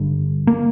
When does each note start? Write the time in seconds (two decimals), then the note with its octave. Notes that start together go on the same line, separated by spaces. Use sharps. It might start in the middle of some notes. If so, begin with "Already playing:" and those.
Already playing: G1 G2 D3
0.47 A#3